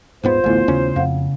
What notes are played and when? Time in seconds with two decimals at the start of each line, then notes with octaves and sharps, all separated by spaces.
0.23 D#1 G#2 B3 F4 C5
0.44 A1 D2 A3 B3 E4
0.68 D#2 C#3 C#4
0.96 F2 F5 F#5